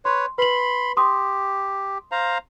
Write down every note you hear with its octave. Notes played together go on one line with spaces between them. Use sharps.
B4 C#5 C6
B4 B5 C6 F#7
G4 C6 D#6
C5 F5 A#5